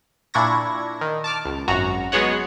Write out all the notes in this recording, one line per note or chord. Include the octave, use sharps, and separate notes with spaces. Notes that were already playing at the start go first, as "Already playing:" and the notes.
A#2 D4 E4 C#6 G#6 A#6
D#3
A5 D6 F6
C#2
G#1 F#2 F#4 A#5
F#3 G#3 B3 G#4 C#5 F#5